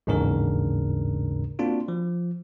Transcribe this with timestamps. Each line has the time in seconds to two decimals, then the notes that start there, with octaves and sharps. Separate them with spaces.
0.07 A1 D#2 G#2 C#3 D4 A#4
1.59 A#3 C4 D4 F4 F#4
1.88 F3